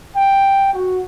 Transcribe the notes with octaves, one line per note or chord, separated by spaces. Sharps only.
G5
F#4